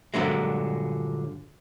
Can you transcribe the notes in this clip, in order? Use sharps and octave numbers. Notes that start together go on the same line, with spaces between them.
G2 A#2 D3 F#3 G#3